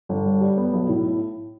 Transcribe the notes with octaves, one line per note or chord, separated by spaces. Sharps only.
G1
G2
G3
B3
B1
A2